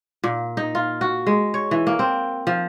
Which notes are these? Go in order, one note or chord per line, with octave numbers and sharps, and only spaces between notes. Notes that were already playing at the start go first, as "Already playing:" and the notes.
A#2
D#4
F4
F#4
G#3
C#5
E3
A#3
C4
F3